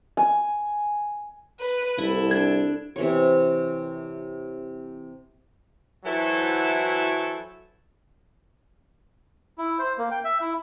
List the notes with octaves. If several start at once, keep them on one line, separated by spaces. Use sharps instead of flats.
G#5
B4
C2 E4 A4
D4 G#6
C3 E3 C#5
E3 F#3 E4 F#4 A4 C5
E4
C5
A#3
G5
E5
E4